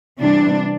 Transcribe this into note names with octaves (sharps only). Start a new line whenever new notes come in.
C3 E3 G3 D4